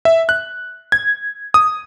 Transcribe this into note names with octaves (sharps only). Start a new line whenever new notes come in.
E5
F#6
G#6
D#6